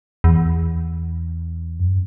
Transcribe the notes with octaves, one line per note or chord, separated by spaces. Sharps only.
E2
F#2